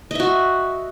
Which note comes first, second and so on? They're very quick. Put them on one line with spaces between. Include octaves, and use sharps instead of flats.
D#5 E5 F#4